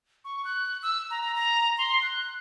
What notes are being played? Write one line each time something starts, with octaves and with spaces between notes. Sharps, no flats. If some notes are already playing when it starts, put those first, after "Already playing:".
C#6
F#6
E6
A#5
A#5
A#5
C6
F#6